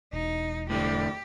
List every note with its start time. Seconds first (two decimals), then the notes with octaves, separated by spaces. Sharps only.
0.13 E1 D#4
0.70 A2 D3 G3 G4